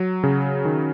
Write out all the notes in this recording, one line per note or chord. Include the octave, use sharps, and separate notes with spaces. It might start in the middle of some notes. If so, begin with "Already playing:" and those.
Already playing: F#3
C#3
D#3